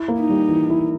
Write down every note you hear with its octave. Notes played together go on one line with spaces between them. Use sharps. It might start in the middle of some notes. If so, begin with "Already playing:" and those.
Already playing: E4
A#3
D#4
G3
E3
E4